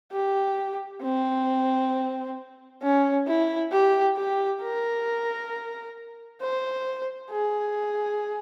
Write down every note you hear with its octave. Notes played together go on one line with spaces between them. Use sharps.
G4
C4
C#4
E4
G4
G4
A#4
C5
G#4